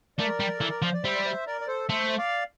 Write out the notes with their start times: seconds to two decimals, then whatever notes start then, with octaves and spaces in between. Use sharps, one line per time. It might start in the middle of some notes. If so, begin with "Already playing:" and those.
0.18 A3 A#4 D5
0.40 G3
0.58 E3 A4
0.70 A#4
0.82 F3 C5
0.93 D5
1.04 G3 C5 E5
1.15 D5
1.25 C5 E5
1.46 A#4 D5
1.61 D5
1.67 A4 C5
1.89 A3 C5 E5
2.18 D5 F5